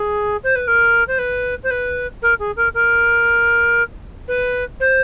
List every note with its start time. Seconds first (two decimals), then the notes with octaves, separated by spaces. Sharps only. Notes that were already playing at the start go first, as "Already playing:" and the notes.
Already playing: G#4
0.43 C5
0.55 B4
0.67 A#4
1.07 C5
1.18 B4
1.63 C5
1.70 B4
2.22 A#4
2.39 G#4
2.56 A#4
2.74 A#4
4.28 B4
4.80 C5